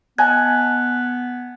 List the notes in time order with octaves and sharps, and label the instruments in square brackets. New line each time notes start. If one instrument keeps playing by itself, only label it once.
[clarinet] B3 [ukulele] D#5 G#5 A5 [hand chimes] F#6 G#6